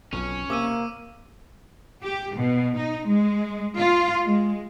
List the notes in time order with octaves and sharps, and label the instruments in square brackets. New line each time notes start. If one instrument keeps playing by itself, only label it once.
[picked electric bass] B1 F2 [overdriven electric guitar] C#4
[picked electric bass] C3 [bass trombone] A#3 [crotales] D6 E6 D#7
[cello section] G4
B2
D#4
G#3
F4
G#3